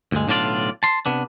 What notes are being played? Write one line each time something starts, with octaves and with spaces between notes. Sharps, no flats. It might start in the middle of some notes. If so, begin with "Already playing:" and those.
D2 G2 G#3
B1 A2 D3 D4 F4 D5
A5 C6
C3 B3 D4